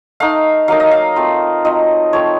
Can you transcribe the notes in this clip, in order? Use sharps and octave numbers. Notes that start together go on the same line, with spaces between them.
A3 D#4 F5
F#3 A#3 D#4 F5
D#5
F5
A3 C4 F4
F#3 C4 F4 D#5
F3 A3 C4 C#5